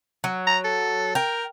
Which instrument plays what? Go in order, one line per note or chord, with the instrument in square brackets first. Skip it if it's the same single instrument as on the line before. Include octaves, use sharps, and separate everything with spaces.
[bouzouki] F#3
[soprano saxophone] A#5
A4
[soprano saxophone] A#4 [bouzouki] G5